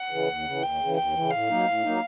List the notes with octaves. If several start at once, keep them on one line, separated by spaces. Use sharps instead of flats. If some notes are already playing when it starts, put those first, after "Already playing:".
Already playing: F#5
C#3 E3
D#2
C#3
E3
D#2 G5
C#3 E3
D#2 G5
E3
C#3
A2 F5
F#3 A#3 D#4
A2
F#3 A#3 D#4